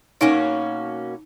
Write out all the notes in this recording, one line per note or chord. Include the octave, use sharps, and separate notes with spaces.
B2 A#3 C#4 D#4 F#4